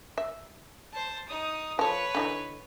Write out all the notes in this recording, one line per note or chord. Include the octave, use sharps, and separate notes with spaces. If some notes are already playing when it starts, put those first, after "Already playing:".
E5
C5 A5
D#4 D#6
F3 A4 B4 C#5
D3 E3 D#4